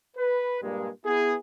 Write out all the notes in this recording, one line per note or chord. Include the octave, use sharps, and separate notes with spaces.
B4
G2 A#2 G3 G#3
B3 E4 G#4